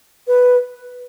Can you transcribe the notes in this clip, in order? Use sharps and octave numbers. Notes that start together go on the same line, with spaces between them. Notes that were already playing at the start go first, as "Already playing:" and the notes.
B4